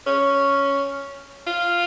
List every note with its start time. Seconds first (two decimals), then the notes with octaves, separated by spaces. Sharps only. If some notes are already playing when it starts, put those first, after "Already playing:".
0.07 C#4
1.47 F4